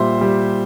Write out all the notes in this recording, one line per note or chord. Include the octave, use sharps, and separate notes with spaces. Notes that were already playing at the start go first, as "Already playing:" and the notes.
Already playing: A#2 G3 C5 E5
G3